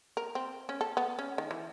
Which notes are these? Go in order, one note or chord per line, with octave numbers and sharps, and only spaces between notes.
A#4
C4
C#4
A4
B3
C#4
D#3
E3